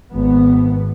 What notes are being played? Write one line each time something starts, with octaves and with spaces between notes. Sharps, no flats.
G#1 B3